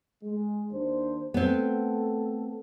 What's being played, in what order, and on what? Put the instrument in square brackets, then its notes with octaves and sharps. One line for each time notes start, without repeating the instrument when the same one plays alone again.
[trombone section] G#3
D#2 D4 C5
[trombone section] A3 A4 [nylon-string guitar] B3 C4